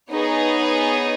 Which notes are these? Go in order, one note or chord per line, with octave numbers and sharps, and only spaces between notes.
B3 D#4 G#4 C#5